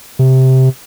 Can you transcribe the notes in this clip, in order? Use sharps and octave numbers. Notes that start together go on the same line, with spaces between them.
C3